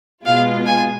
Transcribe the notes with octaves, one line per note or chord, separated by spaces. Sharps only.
B2 G#3 B3 F4 F5
G#5